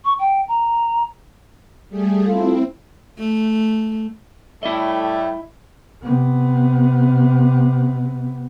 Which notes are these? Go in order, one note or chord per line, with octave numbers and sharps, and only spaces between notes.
C#6
G5
A#5
G3 A3 G#4
C4 E4 F4 A4
A3
A2 G3 A3 E4 D#5
C3 B3